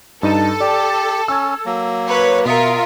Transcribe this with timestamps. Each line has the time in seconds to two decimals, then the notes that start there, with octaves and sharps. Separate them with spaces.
0.23 G2 D#4 A4 D#7
0.60 G4 D5
1.28 C#4 E6 G#6
1.66 F#3 A#3
2.08 B4 C#5
2.45 B2 F4 A#4 E5 D#6 C#7